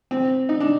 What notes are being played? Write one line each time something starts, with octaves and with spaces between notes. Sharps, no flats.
C4
D#4
D4